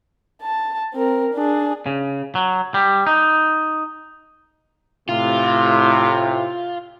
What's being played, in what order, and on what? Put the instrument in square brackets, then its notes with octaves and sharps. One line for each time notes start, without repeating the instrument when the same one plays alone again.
[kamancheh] A5
C4 A#4
D4 G#4
[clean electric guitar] C#3
F#3
G3
D#4
[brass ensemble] A2 C3 [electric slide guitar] F4